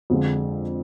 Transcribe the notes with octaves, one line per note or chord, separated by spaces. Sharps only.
F2 D3 F3 G#3